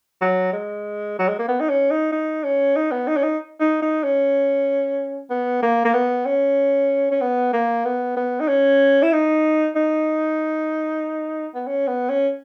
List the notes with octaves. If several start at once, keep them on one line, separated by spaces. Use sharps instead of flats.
F#3
G#3
F#3
G#3
A#3
B3
D#4
C#4
D#4
D#4
C#4
D#4
B3
D#4
C#4
D#4
D#4
D#4
C#4
B3
A#3
A#3
B3
C#4
C#4
B3
A#3
B3
B3
D#4
C#4
E4
D#4
D#4
B3
C#4
B3
C#4